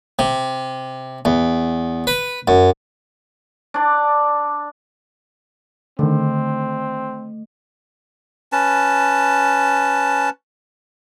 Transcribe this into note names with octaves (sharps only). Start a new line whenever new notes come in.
C3
E2
B4
F#2
D4 D5
D3 D#3 A3 C4
C#4 B4 A5